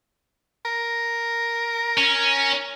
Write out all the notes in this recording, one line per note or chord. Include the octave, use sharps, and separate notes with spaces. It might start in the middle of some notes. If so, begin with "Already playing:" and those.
A#4
C#4